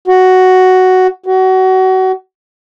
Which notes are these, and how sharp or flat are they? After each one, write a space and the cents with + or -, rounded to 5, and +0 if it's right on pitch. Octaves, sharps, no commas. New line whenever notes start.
F#4 +5
F#4 +25